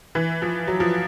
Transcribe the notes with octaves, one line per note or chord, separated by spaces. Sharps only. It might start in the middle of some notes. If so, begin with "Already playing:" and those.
E3
F3
F#3
F3